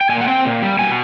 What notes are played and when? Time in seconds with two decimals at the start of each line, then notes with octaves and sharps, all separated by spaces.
0.01 G5
0.09 A#2 G#5
0.21 F#5
0.28 C4 G5
0.45 A#2
0.62 G3
0.79 B2 G#5